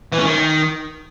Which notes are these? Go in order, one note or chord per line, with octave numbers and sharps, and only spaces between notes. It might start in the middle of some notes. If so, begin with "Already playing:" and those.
E3
C#4
D#3